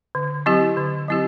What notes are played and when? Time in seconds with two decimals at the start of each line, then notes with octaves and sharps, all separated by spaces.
0.15 D3
0.46 F#3 C4 E4 G4
0.77 D3
1.08 F#3 C4 E4 G4